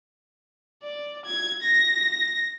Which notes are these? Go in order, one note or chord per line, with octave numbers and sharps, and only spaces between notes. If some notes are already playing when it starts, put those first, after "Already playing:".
D5
G#6
A#6